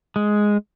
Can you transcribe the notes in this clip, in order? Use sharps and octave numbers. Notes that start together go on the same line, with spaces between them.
G#3